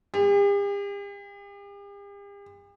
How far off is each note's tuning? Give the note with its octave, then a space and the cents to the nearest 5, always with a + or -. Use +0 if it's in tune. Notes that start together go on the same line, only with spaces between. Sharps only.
G4 +45